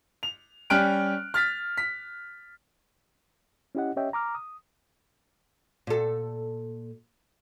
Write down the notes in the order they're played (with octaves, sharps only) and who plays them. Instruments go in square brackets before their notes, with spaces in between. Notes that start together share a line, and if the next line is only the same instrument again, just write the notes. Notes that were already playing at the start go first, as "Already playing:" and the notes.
[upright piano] F7
G3 C#4 G5 F6 F#6 D7
F6 A6 B6
B6
[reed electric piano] C#4 E4 G4 D#5 F#5
C#4 G4 C#5 D#5 E5 G5
A#5 D6 F6
D#6
[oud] A#2 A4